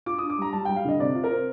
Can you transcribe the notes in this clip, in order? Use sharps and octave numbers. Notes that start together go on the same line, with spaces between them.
F4 D6
D4 D#6
D6
G3 A#5
G3 A5
G3 G5
F5
D3 D#5
C3 D5
F4
A#4
C4